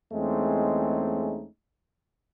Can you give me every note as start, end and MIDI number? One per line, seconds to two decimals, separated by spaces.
0.13 1.46 40
0.13 1.46 56
0.13 1.46 57
0.13 1.46 60
0.13 1.46 61
0.13 1.46 63